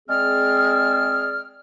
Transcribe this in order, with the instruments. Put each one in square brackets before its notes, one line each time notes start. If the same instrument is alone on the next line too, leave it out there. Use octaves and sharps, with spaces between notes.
[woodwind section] G#3 C4 G#4 D5 F6